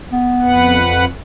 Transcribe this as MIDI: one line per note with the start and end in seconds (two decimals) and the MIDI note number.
0.12 0.79 59
0.42 1.05 41
0.42 1.05 71
0.42 1.05 78